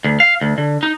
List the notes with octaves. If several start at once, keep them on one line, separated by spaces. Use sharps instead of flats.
D2
F5
D2
D3
D#4